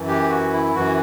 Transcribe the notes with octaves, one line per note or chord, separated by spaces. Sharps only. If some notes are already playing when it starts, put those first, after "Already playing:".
Already playing: F#2 E3
G4
F#4
E4
F#2 E3 F#4